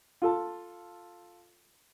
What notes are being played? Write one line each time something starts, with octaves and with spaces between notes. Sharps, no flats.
F4 A4 A5